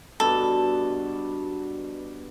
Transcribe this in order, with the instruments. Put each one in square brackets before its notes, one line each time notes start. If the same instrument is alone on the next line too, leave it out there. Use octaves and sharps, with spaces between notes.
[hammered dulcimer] G2 B2 [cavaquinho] A4